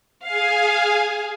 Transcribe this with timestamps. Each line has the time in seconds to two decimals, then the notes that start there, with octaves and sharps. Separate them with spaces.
0.24 G#4 F5 G#5